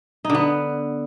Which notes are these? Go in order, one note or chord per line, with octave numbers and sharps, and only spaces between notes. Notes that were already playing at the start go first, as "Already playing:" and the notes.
D#4
D3
B3